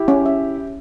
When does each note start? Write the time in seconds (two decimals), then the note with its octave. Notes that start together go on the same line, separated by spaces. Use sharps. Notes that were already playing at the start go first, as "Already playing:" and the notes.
Already playing: E4 G4
0.08 C#4
0.26 E5